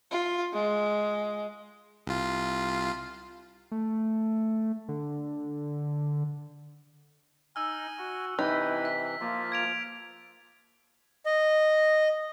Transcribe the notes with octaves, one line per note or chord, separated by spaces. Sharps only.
F4
G#3
C2 F4
A3
D3
D#4 G#5 E6 F6
F#4
C3 E3 D#4 E4 B4
B6
F3 A#3 F4
G#6 D7 F7
D#5